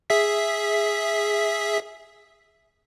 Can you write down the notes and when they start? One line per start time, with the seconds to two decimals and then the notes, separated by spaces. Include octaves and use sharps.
0.10 G#4 E5 B6